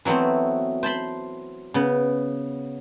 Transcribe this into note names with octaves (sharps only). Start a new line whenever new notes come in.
E3 F#3 A3 B3 C4
C5 A5 B5 C6
C#3 B3